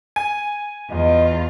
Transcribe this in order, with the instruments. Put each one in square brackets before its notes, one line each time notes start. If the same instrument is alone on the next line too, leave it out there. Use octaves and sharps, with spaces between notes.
[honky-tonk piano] G#5
[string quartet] E2 F4 [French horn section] D#5